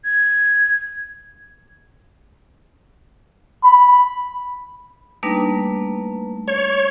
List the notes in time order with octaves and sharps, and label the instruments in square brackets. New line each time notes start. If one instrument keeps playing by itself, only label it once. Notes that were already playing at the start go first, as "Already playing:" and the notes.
[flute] G#6
[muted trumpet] B5
[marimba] G3 D4 D#4 [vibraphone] A3 A#3 B4
[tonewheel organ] C#5